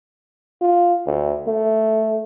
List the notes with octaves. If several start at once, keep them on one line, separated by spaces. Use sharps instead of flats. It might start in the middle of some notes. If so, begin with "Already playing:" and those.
F4
D2
A3